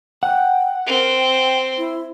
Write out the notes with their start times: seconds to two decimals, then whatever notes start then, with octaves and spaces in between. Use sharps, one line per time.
0.23 F#5 G5
0.87 C4 A#4
1.18 G5
1.78 E4